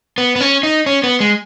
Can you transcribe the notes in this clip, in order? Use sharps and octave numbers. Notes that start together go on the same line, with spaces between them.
B3
B3
C#4
D#4
C#4
B3
G#3